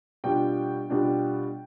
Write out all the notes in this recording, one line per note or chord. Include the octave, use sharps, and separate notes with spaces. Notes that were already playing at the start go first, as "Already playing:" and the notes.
B2 G3 D4 F4 G5
B2 G3 D4 F4